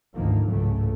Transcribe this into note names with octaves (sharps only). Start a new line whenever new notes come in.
G#1 D2 D#3 F3 A#3
G#1 C#2 A2 C#3 F#3 A3